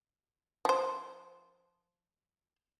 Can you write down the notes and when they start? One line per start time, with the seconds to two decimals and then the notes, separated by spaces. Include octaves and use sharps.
0.65 F3 C5